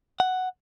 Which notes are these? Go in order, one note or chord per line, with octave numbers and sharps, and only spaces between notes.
F#5